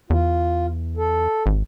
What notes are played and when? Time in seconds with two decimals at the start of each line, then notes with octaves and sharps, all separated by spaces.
0.10 E2 F4
0.97 A4
1.46 G#1